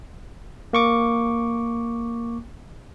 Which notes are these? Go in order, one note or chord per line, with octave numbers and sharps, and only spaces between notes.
A#3 C#6 D6